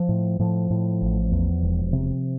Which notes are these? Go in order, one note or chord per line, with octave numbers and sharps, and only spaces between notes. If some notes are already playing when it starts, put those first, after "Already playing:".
Already playing: F3
A2
A2 F3
A2
A1
E2
E1
C3